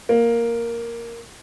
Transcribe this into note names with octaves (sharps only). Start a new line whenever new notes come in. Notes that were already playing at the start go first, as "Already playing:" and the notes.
A#3